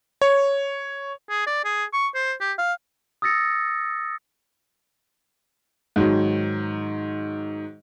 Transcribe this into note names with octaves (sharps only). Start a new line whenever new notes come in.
C#5
G#4
D5
G#4
C#6
C5
G4
F5
D#6 E6 A6 A#6 C#7
G#2 D#3 F#3